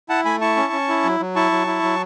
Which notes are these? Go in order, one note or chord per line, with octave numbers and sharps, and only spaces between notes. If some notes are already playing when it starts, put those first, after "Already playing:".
E4 F#5 A5
A3 G#5 B5
E4 A5 C#6
C#4
C#4
E4
F#3
F#3
E4 A5 C#6
F#3
E4
F#3